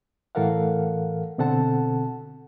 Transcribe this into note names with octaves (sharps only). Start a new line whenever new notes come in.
A2 E3 A4 A#4 F5 F#5
B2 D3 C4 A4 F#5 A5